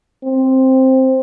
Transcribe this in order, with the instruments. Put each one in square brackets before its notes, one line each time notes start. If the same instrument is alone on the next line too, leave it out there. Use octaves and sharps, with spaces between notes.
[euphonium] C4